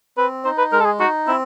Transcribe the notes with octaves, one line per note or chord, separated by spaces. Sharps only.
C4 B4
D#4 C5
B4
G#3 A#4
A4
G#4
D#4 F#4
C4 E4